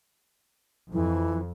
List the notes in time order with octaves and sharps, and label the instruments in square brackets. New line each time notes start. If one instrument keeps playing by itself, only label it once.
[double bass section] F2 [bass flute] E3